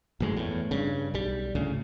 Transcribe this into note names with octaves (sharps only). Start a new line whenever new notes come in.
G#1 F#2 A2 G#3
E2 A2
G2 C#3
B1 G3
D2 A2 C#3